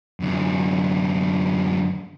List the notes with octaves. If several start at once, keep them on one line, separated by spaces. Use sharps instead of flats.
F#2 D3